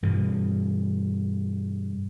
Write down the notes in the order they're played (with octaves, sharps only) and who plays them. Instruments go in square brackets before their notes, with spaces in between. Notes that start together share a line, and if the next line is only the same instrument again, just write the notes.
[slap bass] G2 B2 E3